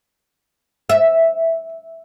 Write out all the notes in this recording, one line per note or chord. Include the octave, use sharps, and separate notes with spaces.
E5